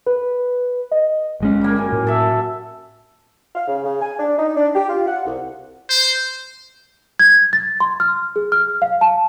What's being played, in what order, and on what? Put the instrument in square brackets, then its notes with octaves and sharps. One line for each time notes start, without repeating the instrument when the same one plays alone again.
[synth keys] B4
D#5
[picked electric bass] G1 G#3 C#4
[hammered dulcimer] G3 A#3
F#2 G#5
[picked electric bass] A2
[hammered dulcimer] A4 E5
[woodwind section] F5
C#3
C#3
G#5
D4
D#4
D4
G4
F4
F#5
C2
[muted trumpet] C5
[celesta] G#6
A6
C6
F6
G#4
F6
F5
A5